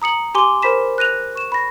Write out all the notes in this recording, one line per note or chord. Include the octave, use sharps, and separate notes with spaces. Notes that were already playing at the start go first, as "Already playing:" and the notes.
A#5 D#6 C#7 F#7
G4 G#5 C6 D6 G7
A#4 C5 B5 B6 E7
F#6 A#6 D#7 F7
C#6 E7
B5 A#6